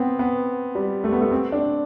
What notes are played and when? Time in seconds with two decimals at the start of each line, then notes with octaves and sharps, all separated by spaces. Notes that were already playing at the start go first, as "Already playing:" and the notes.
Already playing: B3 C4
0.19 B3
0.75 G3
1.04 A3
1.12 B3
1.21 A3
1.31 C4
1.52 D4